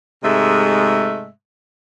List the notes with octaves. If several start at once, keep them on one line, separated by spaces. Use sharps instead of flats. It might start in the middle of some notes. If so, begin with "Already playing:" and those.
G#2 C3 G#3 A3 E5